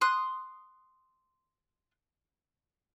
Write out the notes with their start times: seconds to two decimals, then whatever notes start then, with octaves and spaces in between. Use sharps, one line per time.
0.01 C6 D#6 F#6